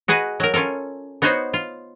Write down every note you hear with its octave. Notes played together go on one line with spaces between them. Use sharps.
F#4 G#4 B4 D#5
F#3 A#4
C#4 F4 A4 A#4
B3 D#4 F#4 C5 C#5
F4